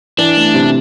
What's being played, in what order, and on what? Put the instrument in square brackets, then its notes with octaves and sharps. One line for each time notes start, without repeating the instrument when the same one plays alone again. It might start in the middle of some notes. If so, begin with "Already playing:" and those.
[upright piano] E3 [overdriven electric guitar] D4
[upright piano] A3
C3